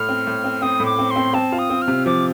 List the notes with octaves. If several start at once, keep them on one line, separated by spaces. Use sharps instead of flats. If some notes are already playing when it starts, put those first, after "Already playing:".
Already playing: A2 F6
C4
A2
C4
C4 D#6
A2
D6
C4
C6
C4
C4 A5
F4
D#6
C4
F6
C3
F3 D6